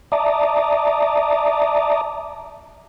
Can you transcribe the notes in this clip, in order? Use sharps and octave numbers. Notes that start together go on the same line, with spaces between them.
D5 E5 A5 A#5 D6 D#6